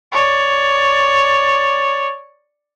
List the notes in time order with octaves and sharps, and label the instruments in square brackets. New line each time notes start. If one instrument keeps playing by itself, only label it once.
[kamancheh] C#5 D5